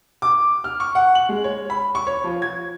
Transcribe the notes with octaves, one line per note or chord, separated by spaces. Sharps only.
D6
F6
C#6
F#5
F#7
G#3
C#5
B5
C#6
C#5
F3
G#6